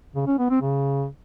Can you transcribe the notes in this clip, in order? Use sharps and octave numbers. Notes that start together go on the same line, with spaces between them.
C#3
C#4
B3
C4
C#3